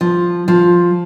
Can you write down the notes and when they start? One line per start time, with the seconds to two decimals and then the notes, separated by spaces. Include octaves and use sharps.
0.01 F3
0.48 F3